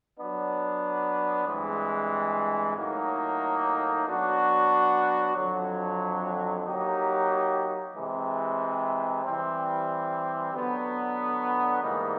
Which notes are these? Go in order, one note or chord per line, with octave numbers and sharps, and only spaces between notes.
F#3 B3 D4
G2 E3 G#3 C4
A2 F#3 A#3 D#4
F#3 B3 D4 F#4
F2 D3 F#3
F#3 A#3 D#4 G4
C3 E3 G#3
E3 G3 C4
D3 F#3 B3 D4
G#2 E3 G3 A#3 D#4